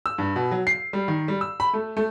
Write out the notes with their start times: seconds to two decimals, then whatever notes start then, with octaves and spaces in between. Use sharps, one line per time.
0.06 E6
0.18 G2
0.36 B2
0.51 F#3
0.67 C7
0.93 G3
1.08 D#3
1.28 G3
1.41 E6
1.60 B5
1.74 A3
1.97 A3